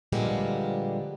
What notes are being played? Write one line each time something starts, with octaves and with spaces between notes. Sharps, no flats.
A#2 D3 F3 G3 G#3 B3